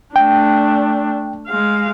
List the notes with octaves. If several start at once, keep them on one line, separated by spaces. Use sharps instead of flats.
A3 D4 G5
G#3 F5